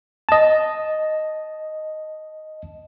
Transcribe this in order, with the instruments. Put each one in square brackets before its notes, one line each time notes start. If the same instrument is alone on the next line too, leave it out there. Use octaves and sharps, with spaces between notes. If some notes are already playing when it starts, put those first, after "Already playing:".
[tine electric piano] D#5 A5